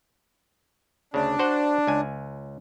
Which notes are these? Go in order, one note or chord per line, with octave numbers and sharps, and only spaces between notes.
D2 C#3 D4
F#4 C5 F#5
C#2 G#5